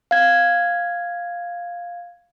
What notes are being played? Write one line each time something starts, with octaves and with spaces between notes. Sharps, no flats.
F5 G#6